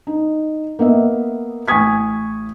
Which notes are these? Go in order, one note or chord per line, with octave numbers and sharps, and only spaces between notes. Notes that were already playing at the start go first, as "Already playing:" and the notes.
D#4
A#3 B3 D#5 E5
A1 G#5 C#6 D#6 G#6 B6